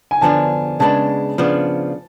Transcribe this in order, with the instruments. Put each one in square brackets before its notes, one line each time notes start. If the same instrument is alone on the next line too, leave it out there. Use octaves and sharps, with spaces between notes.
[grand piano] G#5
[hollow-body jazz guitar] D3 F3 B3 D4 [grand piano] A5
[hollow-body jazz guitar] C#3 G#3 B3 D4 [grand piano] A5
[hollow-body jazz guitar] C#3 F3 B3 D4